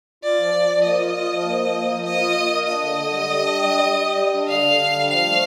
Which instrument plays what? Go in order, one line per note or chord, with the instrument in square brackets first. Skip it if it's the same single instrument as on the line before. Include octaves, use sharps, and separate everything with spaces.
[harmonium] F4 [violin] D5
[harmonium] F3
F3
F3
[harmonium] A#3 [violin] D#5
[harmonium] F4
F4
F3
A#3
F3
A#3
F3
[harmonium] A#3 [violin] D#5
[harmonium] F4
F4
A#3
[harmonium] D4 [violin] D#5
[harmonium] D3
D3
G3
G3
D4
G4
G3
G3
G4
G3
D4
[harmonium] D3 [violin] F5
[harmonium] D3
D4
G3
[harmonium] F3 [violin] F5
[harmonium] A3